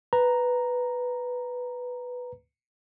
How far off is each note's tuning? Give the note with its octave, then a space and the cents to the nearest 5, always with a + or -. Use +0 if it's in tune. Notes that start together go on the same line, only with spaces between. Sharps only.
B4 +0 A#5 +0